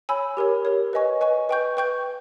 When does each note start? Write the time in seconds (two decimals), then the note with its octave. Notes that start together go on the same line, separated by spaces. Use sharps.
0.09 C#5 G#5 B5 E6
0.37 G4 A#4 C#5
0.65 G4 A#4 C#5
0.93 B4 D#5 G#5 C#6
1.21 B4 D#5 G#5 C#6
1.49 B4 G5 C#6 G6
1.77 B4 G5 C#6 G6